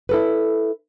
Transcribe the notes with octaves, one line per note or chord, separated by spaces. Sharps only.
E4 A4 B4